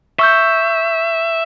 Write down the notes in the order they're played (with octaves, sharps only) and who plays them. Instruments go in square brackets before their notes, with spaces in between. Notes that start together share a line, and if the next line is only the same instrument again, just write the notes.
[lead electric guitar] E5 [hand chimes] C#6 E6 G6